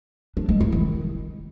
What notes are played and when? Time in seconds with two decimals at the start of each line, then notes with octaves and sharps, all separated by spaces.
0.37 D4
0.49 G#3
0.60 E4
0.72 D#3